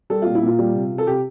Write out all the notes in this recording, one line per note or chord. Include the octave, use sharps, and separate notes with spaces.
G3 A4
A#2 F4
E4
A#2 F4
G3
C3
C3
A4
C3 G4